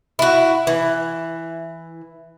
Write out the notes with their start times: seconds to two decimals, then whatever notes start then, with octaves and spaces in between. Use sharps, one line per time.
0.19 E4 F#4
0.67 E3